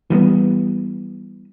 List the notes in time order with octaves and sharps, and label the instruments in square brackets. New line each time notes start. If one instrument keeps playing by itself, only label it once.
[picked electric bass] E3 G3 A3 B3